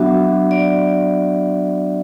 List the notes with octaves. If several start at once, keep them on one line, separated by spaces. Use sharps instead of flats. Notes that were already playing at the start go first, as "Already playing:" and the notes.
Already playing: F#3 B3 D4 F#4 E5
D5